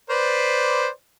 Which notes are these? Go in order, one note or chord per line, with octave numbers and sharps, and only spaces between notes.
B4 C5 D5